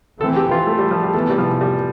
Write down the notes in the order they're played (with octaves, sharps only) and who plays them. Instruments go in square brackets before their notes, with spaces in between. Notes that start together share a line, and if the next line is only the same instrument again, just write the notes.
[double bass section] E3 A3 C4 [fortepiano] A4
[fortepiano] G4
F4
A3
G3
F3
G3
[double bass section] C3 E3 B3 [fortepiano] A3
[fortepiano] G3
F3
G3